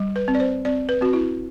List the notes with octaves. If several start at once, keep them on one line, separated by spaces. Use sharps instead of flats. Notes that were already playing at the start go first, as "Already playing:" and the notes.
Already playing: G3
B4
C4
D5
C5
C4 D5
B4
C4 F#4
E4